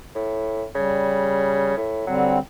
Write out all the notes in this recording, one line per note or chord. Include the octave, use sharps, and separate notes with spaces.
A2
C#3 G3
A2
D3 F#3 G3 C4